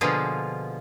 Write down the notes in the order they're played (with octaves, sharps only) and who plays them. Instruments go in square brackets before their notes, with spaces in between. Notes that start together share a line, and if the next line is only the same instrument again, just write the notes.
[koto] B2 D3 F3 A#3 F4 G#4